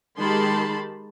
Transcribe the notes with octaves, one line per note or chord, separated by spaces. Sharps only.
D#3 G#3 G4 A5 B5 C6